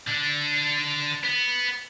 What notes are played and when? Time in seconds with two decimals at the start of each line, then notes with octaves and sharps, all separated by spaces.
0.08 D3 D4
1.24 B3